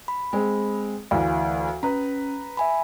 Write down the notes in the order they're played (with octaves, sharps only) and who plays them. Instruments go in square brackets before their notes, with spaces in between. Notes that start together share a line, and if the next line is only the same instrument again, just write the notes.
[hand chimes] B5
[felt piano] G#3 C4
[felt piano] D2 E3 [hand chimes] F5
[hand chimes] C#4 [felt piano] B4 A#5
[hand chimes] E5 G#5 B5